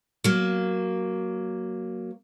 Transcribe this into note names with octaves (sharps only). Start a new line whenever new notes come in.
F#3 A#3